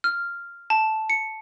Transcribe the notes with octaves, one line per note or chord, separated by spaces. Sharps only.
F6
A5
C#7